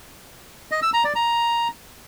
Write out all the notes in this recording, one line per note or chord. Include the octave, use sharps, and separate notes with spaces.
D#5
E6
A#5
D5
A#5